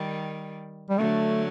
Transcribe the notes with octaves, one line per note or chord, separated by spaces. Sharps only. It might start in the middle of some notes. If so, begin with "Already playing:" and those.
Already playing: D#3 G3
G3
D3 F#3 A3